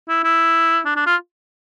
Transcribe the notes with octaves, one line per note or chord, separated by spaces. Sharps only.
E4
E4
D4
D4
F4